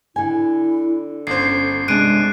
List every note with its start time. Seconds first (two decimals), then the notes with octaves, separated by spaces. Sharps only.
0.16 D3 E4 G#5
1.27 G1 C#4 C5 C7
1.88 C3 G#3 D4 F#6 D7 D#7